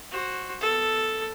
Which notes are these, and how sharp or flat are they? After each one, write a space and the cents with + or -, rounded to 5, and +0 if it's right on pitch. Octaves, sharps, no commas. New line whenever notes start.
F#4 +0 C5 +20
B3 +5 A4 +0